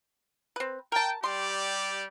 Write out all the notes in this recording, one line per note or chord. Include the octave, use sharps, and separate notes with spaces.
C4 B4
A#4 G5 A5
G3 G4 D5 C6